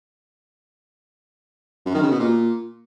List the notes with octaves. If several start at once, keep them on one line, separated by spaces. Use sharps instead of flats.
F#2
D#3
C#3
B2
A#2